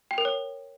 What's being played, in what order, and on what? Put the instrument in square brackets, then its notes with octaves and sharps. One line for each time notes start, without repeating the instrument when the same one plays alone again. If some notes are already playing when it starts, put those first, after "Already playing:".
[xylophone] G5
A#4
C#5